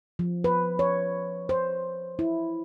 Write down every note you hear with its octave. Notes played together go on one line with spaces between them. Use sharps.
F3
B4
C#5
C5
E4